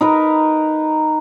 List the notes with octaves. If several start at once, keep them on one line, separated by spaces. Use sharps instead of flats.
D#4 A#4 B4